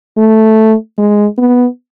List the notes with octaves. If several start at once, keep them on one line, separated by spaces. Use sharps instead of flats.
A3
G#3
B3